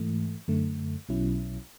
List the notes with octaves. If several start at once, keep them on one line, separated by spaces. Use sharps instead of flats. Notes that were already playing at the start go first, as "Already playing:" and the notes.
Already playing: G#2 E3 A3
F#2 D3 A3
B1 B2 F#3 C#4 E4